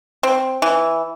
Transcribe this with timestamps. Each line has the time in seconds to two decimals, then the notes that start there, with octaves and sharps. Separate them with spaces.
0.23 C4
0.62 E3